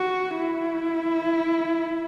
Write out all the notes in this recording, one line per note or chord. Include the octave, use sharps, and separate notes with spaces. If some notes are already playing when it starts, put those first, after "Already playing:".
Already playing: F#4
E4